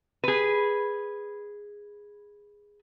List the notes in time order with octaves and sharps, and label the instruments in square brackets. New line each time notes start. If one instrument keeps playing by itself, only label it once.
[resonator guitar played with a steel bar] G#4 B4